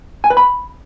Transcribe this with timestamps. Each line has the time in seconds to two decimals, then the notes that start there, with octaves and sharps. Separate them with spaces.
0.24 G#5
0.30 B4
0.37 B5